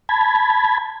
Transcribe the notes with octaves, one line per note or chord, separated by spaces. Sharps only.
A5 B5 G#6